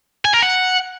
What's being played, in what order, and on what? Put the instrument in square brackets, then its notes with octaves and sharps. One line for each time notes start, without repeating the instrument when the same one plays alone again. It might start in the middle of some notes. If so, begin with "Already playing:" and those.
[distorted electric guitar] G#5
A#4
F#5